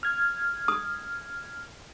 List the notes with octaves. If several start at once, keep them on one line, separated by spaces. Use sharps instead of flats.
F6 G#6
D#6